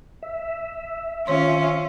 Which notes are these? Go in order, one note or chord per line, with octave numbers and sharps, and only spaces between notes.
E5
D#3 C#4 F4 C#5 C6